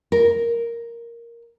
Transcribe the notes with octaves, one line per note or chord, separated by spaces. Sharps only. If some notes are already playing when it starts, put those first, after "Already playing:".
A#4